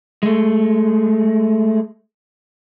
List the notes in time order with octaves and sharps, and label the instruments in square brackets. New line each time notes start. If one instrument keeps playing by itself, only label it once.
[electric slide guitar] G#3 A3